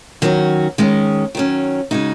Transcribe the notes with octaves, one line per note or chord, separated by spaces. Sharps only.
D#3 F#3 C#4 F#4
D#3 G#3 C#4
D#3 F#3 C#4
C#3 G#3 D#4 F#4